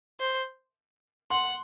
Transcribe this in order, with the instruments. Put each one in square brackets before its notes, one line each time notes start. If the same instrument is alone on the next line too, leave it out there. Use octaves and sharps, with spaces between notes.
[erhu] C5
[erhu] F#5 [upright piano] C6